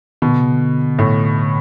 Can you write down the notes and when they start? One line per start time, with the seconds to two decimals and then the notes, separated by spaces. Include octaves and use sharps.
0.22 B2 D#3
0.32 D3
0.42 C#3
0.52 D3
0.99 A2